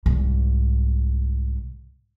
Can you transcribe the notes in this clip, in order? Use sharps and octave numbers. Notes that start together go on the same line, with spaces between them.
C2 G#2